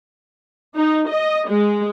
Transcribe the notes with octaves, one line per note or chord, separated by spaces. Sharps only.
D#4
D#5
G#3